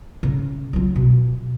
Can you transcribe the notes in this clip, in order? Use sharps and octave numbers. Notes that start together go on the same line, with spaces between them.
C#3
F#3 F4
B2